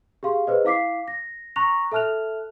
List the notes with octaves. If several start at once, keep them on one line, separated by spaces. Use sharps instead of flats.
G4 G#4 F5 C6
G#4 B4 C5 D#5
E4 F5 D6 B6 C7
A#6
A#5 C#6 F#6 A#6 F7
A4 E5 A5 F6 F#6 F7